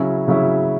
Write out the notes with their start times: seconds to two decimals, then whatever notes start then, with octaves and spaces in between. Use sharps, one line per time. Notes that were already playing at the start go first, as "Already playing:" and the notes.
Already playing: C#3 F#3 C#4 E4
0.28 C#3 F#3 C#4 E4